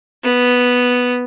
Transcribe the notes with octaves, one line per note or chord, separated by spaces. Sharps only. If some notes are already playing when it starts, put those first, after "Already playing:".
B3